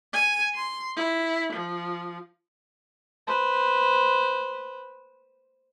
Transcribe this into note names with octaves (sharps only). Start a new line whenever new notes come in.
G#5
C6
E4
F3
B4 C5